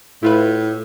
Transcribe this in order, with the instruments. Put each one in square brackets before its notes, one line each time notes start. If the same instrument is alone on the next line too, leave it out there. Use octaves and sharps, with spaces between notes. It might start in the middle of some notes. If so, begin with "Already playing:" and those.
[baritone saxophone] A2 [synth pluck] E4 F4 B4